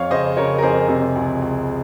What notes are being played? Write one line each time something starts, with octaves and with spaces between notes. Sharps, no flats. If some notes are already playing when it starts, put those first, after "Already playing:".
Already playing: F2 C#5 F5
C#3 C5 D#5
C#3 A#4 C#5
A#4
F2 G#4 C5
C3
C#2
C#2